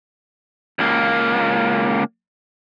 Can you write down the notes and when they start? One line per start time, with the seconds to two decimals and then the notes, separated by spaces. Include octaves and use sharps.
0.79 C#2 A#3